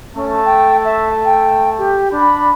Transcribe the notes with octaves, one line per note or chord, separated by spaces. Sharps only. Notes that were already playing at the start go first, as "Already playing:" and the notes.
A3 C#4 A5
G5
E5
G5
G4
D4 B5